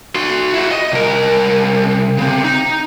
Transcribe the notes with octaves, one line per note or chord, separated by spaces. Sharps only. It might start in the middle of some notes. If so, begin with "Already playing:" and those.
F#4 C6
E4 F#4
D#5
C2 A#4
C#3 C4
D#4